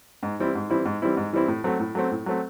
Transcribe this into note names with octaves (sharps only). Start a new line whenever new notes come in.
G#2
E3 G3 C4 E4
G#2
E3 G3 C4 E4
G#2
E3 G3 C4 E4
G#2
E3 G3 C4 E4
A2
F#3 A3 C4
A2
F#3 A3 C4
A2
F#3 A3 C4